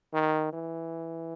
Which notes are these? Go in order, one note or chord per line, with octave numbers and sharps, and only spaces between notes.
D#3
E3